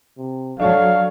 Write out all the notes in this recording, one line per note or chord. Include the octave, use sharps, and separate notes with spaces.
C3
F#3 D4 A4 C#5 F5 A5